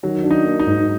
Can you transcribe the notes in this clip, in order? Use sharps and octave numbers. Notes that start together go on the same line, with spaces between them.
D#3 F#3
D4
D#4
A#3
D#4
G#2